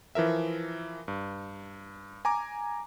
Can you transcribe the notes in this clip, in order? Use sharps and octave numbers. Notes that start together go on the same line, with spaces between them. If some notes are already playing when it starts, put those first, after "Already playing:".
E3 F3 A#4 E5
G2
G#5 A#5 D6